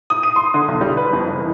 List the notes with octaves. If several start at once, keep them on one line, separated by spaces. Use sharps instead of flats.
D#6
D#7
C6
D3
B1
G3
B4
F2
F#1
E3